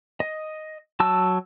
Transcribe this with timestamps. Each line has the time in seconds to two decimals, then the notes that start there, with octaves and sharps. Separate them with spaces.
0.20 D#5
1.00 F#3 A5 E6